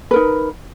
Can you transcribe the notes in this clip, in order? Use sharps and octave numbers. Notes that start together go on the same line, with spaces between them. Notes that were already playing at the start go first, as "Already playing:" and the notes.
D#4 A#4 B4